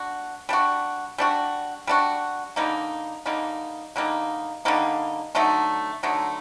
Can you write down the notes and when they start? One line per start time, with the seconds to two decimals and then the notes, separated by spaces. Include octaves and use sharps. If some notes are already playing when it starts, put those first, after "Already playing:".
Already playing: D4 F#4
0.49 G3 D4 F#4
1.18 G3 D4 F#4
1.87 G3 D4 F#4
2.56 D3 G3 A#3 D#4
3.26 D3 G3 A#3 D#4
3.96 D3 G3 A#3 D#4
4.65 D3 G3 A#3 D#4
5.35 D3 F#3 A3 D#4
6.03 D3 F#3 A3 D#4